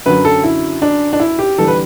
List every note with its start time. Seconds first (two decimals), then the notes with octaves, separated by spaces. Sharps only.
0.06 F#2 D3 F#3 B4
0.25 A4
0.44 E4
0.82 D4
1.13 D4
1.20 E4
1.39 G4
1.58 E2 D3 G3 A4
1.68 B4